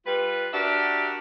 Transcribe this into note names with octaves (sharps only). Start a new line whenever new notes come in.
G3 F4 B4
D4 F#4 G4 A#4 E5